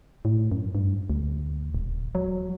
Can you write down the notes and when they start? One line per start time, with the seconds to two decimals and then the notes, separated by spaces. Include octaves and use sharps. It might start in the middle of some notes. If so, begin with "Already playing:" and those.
0.25 A2
0.52 F#2
0.75 G2
1.10 D2
1.75 D#1
2.15 F#3